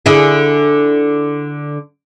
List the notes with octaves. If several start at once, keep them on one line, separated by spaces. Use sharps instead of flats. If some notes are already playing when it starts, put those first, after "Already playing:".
D3 E4 G#4